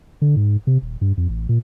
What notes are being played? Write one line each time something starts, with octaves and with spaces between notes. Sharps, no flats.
D3
G#2
C3
D#1
G2
F2
A1
A#2